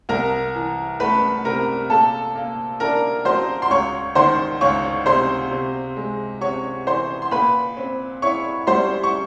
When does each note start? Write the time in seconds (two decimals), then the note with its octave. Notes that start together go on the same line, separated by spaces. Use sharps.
0.09 C2 A#4 A#5
0.55 E3
1.00 A3 B4 B5
1.45 C3 A#4 A#5
1.90 A#2 A4 A5
2.35 A#3
2.80 D4 A#4 A#5
3.25 F#3 C5 C6
3.62 C6
3.70 C#2 C#5 C#6
4.15 D#3 C5 C6
4.61 C#2 C#5 C#6
5.06 C3 C5 C6
5.51 C3
5.96 G#3
6.41 C3 C#5 C#6
6.86 E3 C5 C6
7.22 C6
7.31 A#2 B4 B5
7.77 C4
8.22 E4 C#5 C#6
8.67 G3 C5 C6
9.03 C#6